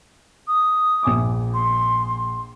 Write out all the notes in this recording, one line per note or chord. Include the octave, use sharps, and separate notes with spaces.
D#6
A#1 G#5 D6
C6